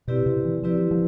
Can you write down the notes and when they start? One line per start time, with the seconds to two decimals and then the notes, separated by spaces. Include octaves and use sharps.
0.08 B2 C4 E4 G4 B4 D5
0.26 C3
0.45 E3
0.63 F3 C4 E4 G4 B4 D5
0.91 F3